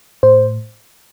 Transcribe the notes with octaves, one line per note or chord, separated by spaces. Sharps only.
A2 C5